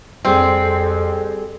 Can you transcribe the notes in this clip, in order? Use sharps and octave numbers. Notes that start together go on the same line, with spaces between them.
F2 G3 C4 G#4 A4